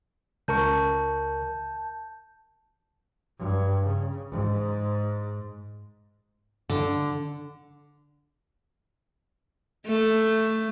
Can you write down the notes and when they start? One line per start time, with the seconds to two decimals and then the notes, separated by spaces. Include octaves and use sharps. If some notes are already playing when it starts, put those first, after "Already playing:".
0.48 C#2 A#4 A5 C#6 G6
3.39 G2
3.85 C#3
4.30 G#2
6.69 D3
9.87 A3